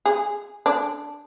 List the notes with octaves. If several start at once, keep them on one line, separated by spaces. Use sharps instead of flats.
G#4
D4